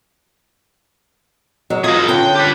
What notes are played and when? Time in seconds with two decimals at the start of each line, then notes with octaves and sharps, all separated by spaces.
1.70 F#3 G#3
1.84 F4 G#4 A#4
2.08 D3 C#4 F4 G5
2.35 G4 B4